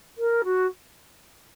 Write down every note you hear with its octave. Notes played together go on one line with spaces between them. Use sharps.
A#4
F#4